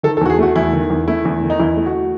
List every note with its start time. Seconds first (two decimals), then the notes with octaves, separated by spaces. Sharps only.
0.03 D#3 A4
0.17 A4
0.21 E2 F#4
0.30 G#4
0.39 A3 F#4
0.56 E2 E4
0.73 D#3
0.90 E2
1.08 A3 E4
1.25 E2
1.43 D#3
1.50 D#4
1.59 E2 E4
1.77 A3
1.86 F#4